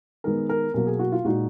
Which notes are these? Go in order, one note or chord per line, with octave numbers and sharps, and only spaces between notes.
D#3 G#3 B3 A#4
A#4
B2 F#3 A#3 A#4
G#4
F#4
F4
A#2 G#3 D#4 F#4